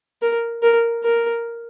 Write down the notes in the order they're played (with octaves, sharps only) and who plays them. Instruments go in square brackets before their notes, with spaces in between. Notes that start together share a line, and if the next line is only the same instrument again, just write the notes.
[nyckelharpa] A#4
A#4
A#4